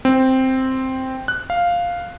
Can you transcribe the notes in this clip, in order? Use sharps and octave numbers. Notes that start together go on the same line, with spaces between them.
C4
F#6
F5